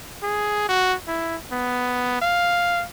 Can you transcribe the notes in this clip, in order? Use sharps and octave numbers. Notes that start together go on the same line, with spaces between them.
G#4
F#4
E4
B3
F5